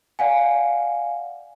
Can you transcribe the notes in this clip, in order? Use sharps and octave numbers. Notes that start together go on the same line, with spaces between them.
D5 F5 F#5 G#5